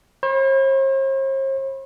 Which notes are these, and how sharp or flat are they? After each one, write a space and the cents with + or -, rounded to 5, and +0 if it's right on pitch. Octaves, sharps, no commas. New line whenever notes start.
C5 +45 B5 -5